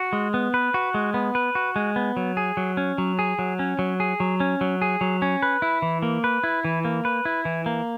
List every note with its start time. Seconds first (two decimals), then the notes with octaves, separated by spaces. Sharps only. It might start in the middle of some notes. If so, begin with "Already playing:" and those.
Already playing: F#4
0.13 G#3
0.34 B3
0.54 B4
0.74 F#4
0.94 G#3
1.14 B3
1.35 B4
1.55 F#4
1.76 G#3
1.96 B3
2.17 F#3
2.37 G#4
2.57 F#3
2.77 C#4
2.98 F#3
3.19 G#4
3.39 F#3
3.59 C#4
3.79 F#3
4.00 G#4
4.20 F#3
4.40 C#4
4.61 F#3
4.82 G#4
5.01 F#3
5.22 C#4
5.43 B4
5.62 E4
5.82 E3
6.03 A#3
6.24 B4
6.44 E4
6.65 E3
6.85 A#3
7.05 B4
7.25 E4
7.45 E3
7.66 A#3